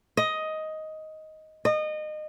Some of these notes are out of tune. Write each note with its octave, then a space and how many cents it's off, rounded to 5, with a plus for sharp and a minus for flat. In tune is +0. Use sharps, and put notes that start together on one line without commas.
D#5 +10
D#5 -25